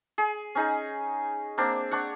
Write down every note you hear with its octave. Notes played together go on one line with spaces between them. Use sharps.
G#4
C#4 D#4 G#4
A#3 C4 D4
D4 C#5 F#5